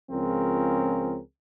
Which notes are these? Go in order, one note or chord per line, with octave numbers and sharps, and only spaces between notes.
C#2 F3 C4 C#4 G#4 A#4